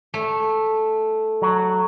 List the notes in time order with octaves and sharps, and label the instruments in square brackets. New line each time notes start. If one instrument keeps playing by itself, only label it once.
[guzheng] A3
[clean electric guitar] F#3